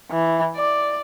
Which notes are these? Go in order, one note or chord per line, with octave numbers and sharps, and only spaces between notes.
E3
D5